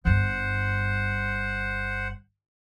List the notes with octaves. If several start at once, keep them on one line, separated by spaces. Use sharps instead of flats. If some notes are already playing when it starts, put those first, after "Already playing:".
G1 G2 C5 F#5